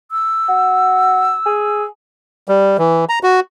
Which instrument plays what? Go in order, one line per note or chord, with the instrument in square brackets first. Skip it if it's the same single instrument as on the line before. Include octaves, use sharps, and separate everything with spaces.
[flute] E6
[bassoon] F#4
G#4
[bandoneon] G3
E3
A#5
F#4